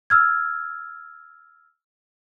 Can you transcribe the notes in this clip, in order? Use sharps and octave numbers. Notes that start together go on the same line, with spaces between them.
E6 F6 G#6